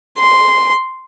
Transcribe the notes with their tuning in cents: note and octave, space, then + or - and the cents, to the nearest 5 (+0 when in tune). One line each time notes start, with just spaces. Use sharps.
C6 -5